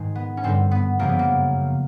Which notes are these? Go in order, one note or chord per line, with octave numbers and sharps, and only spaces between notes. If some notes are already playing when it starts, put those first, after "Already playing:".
Already playing: G#2 D#3 G#3
B3
C#4
G2 D3 G3 C4
B3
F#2 C#3 F3 A#3
B3
A#3